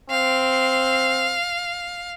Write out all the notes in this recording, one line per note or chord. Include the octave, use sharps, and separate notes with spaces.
C4 F5